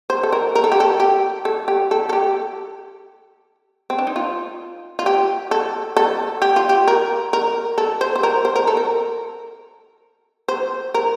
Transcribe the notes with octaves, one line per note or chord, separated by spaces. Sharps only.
C5
A4
A#4
A#4
A4
G4
A4
G4
A4
G4
A4
A4
G4
C4
D4
D#4
F4
F4
G4
A4
A4
G4
F4
G4
A#4
A#4
A4
C5
C5
A#4
C5
A#4
A4
A#4
C5
A#4